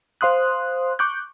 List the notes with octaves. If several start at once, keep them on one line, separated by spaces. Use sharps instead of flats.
C5 F5 C6 D#6 F#6
C#6 D6 F#6 G6